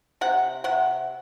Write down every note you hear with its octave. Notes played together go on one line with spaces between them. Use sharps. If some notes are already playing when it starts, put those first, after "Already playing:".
C3 F#5
C3 F#5